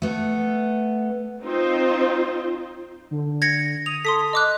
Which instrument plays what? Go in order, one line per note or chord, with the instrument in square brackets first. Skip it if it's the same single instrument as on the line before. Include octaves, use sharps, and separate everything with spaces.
[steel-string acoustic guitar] A3 B3
[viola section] C4 D#4 F4 C5
[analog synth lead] D3
[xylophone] G#6 A#6 C#7
[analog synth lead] D#6 [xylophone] F7
[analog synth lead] A4 [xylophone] C6 D#6 B6
[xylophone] D#5 D6 F#6